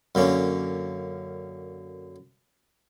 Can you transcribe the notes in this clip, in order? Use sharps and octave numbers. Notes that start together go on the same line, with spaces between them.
F#2 D3 A#3 C#4